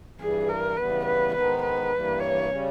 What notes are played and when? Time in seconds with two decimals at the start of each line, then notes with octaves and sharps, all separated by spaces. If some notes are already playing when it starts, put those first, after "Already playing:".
0.19 G2 E3 G3 G#4
0.48 A#4
0.77 C#3 E3 G3 B3 B4
1.05 B4
1.34 G#2 D#3 G#3 B3 D#4 B4
1.63 B4
1.91 G2 E3 G3 A#3
2.20 C#5
2.48 C#3 G3 C#4